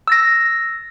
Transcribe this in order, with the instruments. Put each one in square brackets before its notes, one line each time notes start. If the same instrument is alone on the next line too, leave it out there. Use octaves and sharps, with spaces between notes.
[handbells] E6 A6 A#6